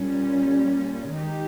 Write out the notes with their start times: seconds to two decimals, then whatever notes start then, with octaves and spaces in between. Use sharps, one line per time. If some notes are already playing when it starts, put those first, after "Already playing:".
Already playing: A#2 G3 C#4
1.15 D#3 G#3 D#4 G4